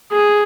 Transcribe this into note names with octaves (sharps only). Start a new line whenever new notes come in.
G#4